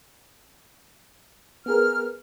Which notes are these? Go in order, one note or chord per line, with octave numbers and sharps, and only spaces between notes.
B3 G#4 A#4 F6